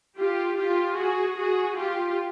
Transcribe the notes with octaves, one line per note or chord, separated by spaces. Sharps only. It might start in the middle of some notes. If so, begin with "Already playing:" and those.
F4 G4
F4 G4
F#4 G#4
F#4 G#4
F4 G4